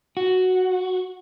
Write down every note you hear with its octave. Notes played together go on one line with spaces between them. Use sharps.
F#4